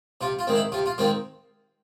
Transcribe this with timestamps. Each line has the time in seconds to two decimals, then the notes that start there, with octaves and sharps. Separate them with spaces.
0.21 C3 F4
0.39 F4
0.47 D#3 G#3 C4
0.55 E4
0.72 C3 F4
0.86 F4
0.98 D#3 G#3 C4 F4